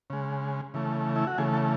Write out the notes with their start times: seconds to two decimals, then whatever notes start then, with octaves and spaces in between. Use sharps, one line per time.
0.10 C#3 G#3
0.74 C#3 E3 A3
1.16 E4
1.27 F#4
1.38 C#3 E3 A3 G#4
1.53 A4